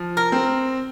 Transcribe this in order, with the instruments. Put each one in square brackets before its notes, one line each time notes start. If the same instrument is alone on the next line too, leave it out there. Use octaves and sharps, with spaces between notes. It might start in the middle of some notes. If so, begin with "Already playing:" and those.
Already playing: [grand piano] F3
[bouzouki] A#4
[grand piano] C4